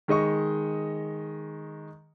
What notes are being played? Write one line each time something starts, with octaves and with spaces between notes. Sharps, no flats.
D#3 G#3 D#5 C#6